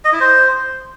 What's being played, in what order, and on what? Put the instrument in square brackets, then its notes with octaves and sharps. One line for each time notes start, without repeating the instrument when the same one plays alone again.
[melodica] D#5
E4
C5